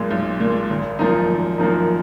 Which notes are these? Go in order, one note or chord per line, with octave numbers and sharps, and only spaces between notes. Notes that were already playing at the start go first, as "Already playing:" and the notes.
Already playing: B1 A#2 G#3
B1
A#2
G#3
G#1
F#2 F3 A#3 D#4
G#1
F#2 F3 A#3 D#4